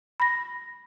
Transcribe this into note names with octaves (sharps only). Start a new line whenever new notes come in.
B5 A#6